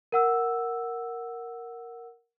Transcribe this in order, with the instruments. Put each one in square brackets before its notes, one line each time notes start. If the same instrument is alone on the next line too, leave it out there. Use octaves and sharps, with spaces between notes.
[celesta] A#4 F#5 E6